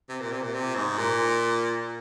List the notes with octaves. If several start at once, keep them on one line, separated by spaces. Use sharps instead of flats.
C3
A#2
C3
A#2
C3
G#2
A#2